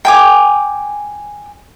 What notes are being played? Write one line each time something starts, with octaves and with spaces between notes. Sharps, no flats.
G5 G#5 D6